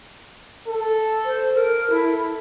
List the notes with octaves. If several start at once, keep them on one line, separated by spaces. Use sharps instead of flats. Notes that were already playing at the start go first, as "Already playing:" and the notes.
A4
C5
A#4
E4 A4